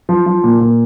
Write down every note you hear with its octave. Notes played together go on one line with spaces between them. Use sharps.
F3
F3
A#2
A#2